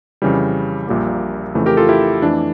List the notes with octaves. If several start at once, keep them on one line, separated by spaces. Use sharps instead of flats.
F2 C#3 E3 G3
A#1 A#2 G3 A#3
F2 C#3 E3 A3
G4 A#4
F4 A4
E4 G4
F2 E3 A3 D4